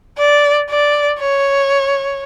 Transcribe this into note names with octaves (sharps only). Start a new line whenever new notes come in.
D5
D5
C#5